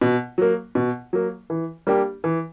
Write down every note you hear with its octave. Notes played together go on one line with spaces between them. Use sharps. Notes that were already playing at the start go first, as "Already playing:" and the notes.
B2
F#3 A#3
B2
F#3 A#3
E3
G3 A#3 D4 G4
E3